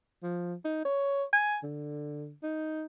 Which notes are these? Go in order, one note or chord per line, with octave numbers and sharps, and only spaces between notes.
F3
D#4
C#5
G#5
D3
D#4